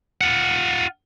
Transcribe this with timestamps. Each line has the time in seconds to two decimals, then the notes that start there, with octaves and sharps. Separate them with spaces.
0.21 F4 F#5